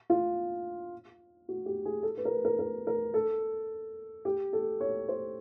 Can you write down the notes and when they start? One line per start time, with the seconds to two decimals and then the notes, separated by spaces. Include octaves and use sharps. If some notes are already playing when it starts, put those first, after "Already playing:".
0.10 F4
1.49 F#4
1.66 G4
1.85 G#4
2.03 A4
2.17 B4
2.25 A#4
2.32 B4
2.45 A#4
2.59 A#4
2.87 A#4
3.14 A4
4.25 G4
4.53 A4
4.80 C#5
5.09 C5